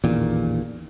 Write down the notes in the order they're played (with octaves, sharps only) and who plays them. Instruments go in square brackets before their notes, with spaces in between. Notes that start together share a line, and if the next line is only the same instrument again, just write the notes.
[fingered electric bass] A1 E2 A#2 D#3